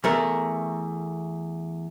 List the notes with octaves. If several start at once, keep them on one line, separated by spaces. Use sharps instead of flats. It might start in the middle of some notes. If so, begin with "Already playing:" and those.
E2 A3 A#4